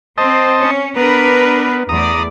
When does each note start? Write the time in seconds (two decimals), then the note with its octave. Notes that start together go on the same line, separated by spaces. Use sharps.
0.18 C4 C5 D#5 A5
0.61 C#4
0.96 B3 D4 A#4 B4
1.89 E2 A3 D5 A#5 D#6